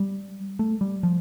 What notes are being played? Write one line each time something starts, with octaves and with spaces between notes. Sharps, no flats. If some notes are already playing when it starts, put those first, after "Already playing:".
Already playing: G3
A3
G3
F3